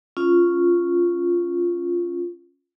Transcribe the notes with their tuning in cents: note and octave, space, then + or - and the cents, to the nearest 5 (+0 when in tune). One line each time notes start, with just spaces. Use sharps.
C#4 +0 F4 -5